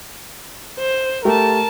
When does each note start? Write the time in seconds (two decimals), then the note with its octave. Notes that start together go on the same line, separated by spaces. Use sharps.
0.79 C5
1.25 A3 G4 A#4 A5